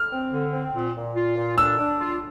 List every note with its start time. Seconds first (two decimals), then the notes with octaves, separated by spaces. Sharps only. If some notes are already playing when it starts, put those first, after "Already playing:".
Already playing: F6
0.12 C4
0.33 D3
0.53 C4
0.75 A#2
0.96 A#2
1.15 F4
1.37 A#2
1.57 D4 E6
1.79 D4
2.00 F4